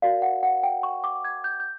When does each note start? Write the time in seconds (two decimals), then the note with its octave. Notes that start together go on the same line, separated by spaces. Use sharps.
0.02 F#4 A#4 D5 F5
0.22 F#5
0.43 F#5
0.63 G5
0.83 C#6
1.04 D6
1.24 G#6
1.44 G6
1.60 G6